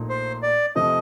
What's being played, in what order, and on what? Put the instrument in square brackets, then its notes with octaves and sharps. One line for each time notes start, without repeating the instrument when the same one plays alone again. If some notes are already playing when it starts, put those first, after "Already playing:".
Already playing: [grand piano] A#1 A#2 A3 D#4
[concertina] C5
D5
[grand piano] F2 C3 F3 A3 [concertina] D#5